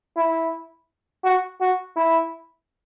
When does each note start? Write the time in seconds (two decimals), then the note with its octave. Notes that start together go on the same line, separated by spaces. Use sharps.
0.17 E4
1.24 F#4
1.61 F#4
1.97 E4